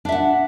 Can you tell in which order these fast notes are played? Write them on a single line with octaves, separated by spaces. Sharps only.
D4 E5 F#5